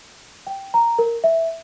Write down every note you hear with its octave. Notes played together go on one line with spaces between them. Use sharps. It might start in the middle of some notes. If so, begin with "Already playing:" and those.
G5
A#5
A#4
E5